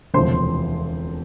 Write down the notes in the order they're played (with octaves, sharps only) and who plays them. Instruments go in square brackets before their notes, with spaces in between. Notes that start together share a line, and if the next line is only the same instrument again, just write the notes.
[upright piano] E1 D2 C3 F3 C5 C6